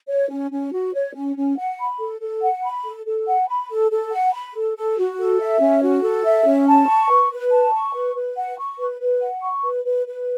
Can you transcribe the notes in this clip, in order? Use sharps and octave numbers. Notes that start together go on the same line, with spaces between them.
C#5
C#4
C#4
F#4
C#5
C#4
C#4
F#5
B5
A4
A4
F#5
B5
A4
A4
F#5
B5
A4
A4
F#5
B5
A4
A4
F#4
A4
E5
C#4
F#4
A4
E5
C#4
A5
C#6
B4
B4
A5
C#6
B4
B4
F#5
C#6
B4
B4
F#5
C#6
B4
B4
B4